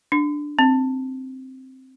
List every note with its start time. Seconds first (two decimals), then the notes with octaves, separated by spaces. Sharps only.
0.12 D4
0.59 C4